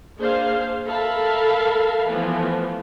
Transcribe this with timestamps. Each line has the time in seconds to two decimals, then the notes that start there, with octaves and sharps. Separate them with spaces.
0.19 A#3 D4 G#4 C5 F5
0.87 A4 A#4 E5 F5 A5 B5
2.09 E3 F3 A3 B3